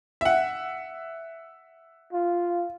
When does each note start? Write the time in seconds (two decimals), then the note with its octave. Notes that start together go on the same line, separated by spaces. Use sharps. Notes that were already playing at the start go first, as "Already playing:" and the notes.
0.21 E5 F#5
2.13 F4